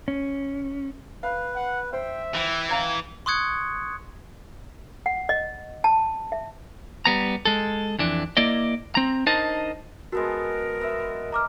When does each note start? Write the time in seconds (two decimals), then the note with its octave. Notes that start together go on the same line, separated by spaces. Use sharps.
0.08 C#4
1.23 B4 F5
1.55 F#5
1.93 C5 E5 G5
2.34 E3 G5
2.69 F5 A#5 G#6
3.26 C6 C#6 D#6 F#6 G#6 C#7
5.06 F#5
5.29 D#5
5.84 A5
6.32 E5
7.05 G3 B3 A#5
7.45 G#3 A4
7.99 F2 E3 D4
8.37 A#3 E4 D5 D#5
8.95 C4 A#5
9.26 D4 D#4 A#4 C5 D#5 A5
10.12 G#3 B3 F#4 A4 A#4
10.81 B3 E5
11.32 A#5 D6 F6